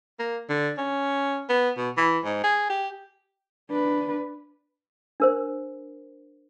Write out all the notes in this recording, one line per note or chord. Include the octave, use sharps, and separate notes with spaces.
A#3
D3
C#4
B3
B2
E3
G#2
G#4
G4
D4 B4
D4 A#4 C5